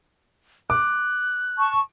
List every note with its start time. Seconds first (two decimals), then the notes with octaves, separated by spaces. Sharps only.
0.70 D6 F#6
1.58 A5 C#6